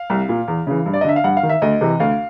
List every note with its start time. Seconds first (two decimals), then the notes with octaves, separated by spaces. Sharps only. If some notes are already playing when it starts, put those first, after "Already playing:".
Already playing: F5
0.10 C2
0.29 A#2
0.48 E2
0.67 C#3 E3
0.86 G2
0.94 D5
1.01 D#5
1.04 D3 E5
1.16 F5
1.24 G2 F#5
1.37 F5
1.43 D#3
1.49 E5
1.62 D2 D#5
1.81 C3 E3
2.00 D2 F5